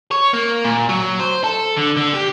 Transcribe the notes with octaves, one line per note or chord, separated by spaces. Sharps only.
C#5
A#3
A#2
F#3
C5
A4
D3
D3
G4